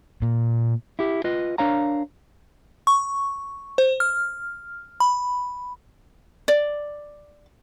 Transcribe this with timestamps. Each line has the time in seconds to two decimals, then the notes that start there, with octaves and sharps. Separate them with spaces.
0.22 A#2
0.99 E4 G4
1.24 F4 B4 D#5
1.58 D4 A#4 C#5 F5 A#5
2.87 C#6
3.78 C5
4.00 F6
5.00 B5
6.48 D5